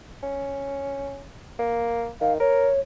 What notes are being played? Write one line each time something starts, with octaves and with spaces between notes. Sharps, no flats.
C#4
A#3
D#3 F5
A#4 C#5